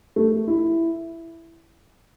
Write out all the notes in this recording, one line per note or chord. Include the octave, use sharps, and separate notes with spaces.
A3
E4